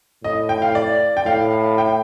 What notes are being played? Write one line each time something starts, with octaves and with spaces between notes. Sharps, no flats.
A2 D#5
G5
F5
D5
G5
A2 F5
G5